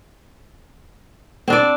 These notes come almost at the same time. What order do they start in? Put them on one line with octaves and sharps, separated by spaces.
C4 D4 D5